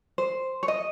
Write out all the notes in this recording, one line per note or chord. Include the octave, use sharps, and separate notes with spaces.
C5
C#5
D#5